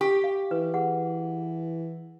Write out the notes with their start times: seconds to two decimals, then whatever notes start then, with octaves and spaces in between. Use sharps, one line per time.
0.01 G4 C#6
0.24 F5
0.51 E3 B4
0.74 G#4 F#5